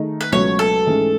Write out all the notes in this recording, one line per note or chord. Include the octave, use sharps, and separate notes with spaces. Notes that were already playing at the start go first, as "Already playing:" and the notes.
Already playing: D#3 A3 D#4 G#4
B4
C#2 B2 F#3 A3 C#5
A4
G#2 E3 A3 C#4 G#4